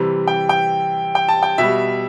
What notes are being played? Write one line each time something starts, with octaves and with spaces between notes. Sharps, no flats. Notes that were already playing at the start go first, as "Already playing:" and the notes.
Already playing: C3 E3 G3
G5
G5
G5
A5
G5
B2 G3 E5